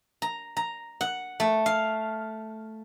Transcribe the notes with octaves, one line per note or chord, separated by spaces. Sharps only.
A#5
A#5
F#5
A3
F5